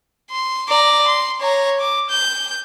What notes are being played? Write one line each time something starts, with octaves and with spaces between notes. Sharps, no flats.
C6
D5 A#5
C6
C#5 A#5
D6
G6